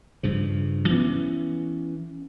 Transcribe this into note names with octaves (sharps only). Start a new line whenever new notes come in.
G2 C#3 F3
E3 B3 C#4